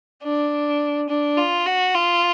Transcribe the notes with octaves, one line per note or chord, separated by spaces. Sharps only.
D4
D4
F4
F#4
F4